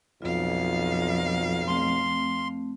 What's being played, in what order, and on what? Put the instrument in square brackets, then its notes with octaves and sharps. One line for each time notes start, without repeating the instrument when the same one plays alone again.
[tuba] B1 [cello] F2 F5 [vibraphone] F4
[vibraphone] A3 C4 [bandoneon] C6